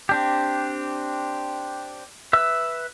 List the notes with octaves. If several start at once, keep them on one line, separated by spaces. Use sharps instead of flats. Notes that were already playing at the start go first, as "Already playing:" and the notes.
C4 D4 G4
B4 E5 E6